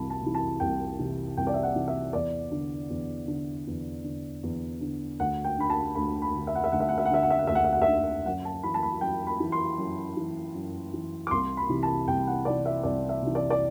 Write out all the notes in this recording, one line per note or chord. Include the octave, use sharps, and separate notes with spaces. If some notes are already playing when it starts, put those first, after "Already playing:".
Already playing: C2 C3 E3 A5 B5
A5
C3 E3
A5
C2 G5
C3 E3
C2 G5
D5
E5
F#5
C3 E3
E5
E2 D5
D3
E2
D3
E2
D3
E2
D3
D2 F#5
G5
D3 B5
A5
D2 B5
B5
D3
E5
F#5
E5
D2 F#5
E5
F#5
E5
F#5
D3 E5
F#5
E5
F#5
D2 E5
F#5
E5
F#5
E5
D3
F#2 F#5
A5
E3 B5
A5
B5
F#2 G5
B5
E3
C6
F#2
E3
F#2
E3
D6
C2 C6
B5
C3 E3
A5
C2 G5
F#5
C3 E3 D5
E5
C2 D5
E5
C3 E3
D5
D5